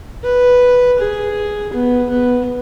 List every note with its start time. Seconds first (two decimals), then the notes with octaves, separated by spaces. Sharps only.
0.24 B4
0.99 G#4
1.73 B3
2.10 B3